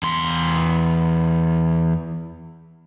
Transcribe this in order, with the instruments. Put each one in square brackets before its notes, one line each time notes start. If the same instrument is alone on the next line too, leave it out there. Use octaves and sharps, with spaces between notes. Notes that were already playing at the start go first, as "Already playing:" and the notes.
[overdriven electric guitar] E2 C6